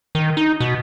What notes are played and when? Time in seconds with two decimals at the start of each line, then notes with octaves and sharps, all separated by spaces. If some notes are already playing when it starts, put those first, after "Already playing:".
0.15 D#3
0.37 D#4
0.60 B2